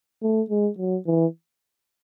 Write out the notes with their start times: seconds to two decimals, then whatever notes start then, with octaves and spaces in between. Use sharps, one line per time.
0.22 A3
0.50 G#3
0.78 F#3
1.06 E3